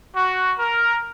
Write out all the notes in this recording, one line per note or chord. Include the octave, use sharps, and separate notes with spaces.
F#4
A#4